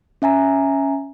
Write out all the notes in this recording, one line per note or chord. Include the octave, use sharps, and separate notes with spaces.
C#4 E5 G#5 A#5